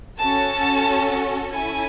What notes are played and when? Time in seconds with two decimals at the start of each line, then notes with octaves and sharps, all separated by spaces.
0.18 C#4 F#4 A4 A5
1.53 C#4 E4 A4 G#5